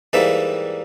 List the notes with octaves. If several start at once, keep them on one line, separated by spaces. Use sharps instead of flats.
G#2 E3 G3 A#3 E5